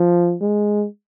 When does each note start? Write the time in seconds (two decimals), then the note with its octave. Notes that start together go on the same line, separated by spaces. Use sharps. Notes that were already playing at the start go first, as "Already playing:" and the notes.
Already playing: F3
0.41 G#3